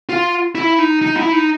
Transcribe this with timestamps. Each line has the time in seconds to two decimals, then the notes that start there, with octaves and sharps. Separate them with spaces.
0.09 F4
0.55 E4
0.78 D#4
1.02 D#4
1.17 E4
1.32 D#4